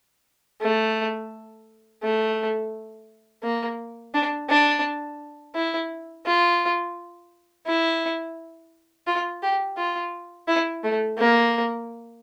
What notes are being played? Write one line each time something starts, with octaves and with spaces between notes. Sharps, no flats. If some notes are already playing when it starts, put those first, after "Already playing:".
A3
A3
A#3
D4
D4
E4
F4
E4
F4
G4
F4
E4
A3
A#3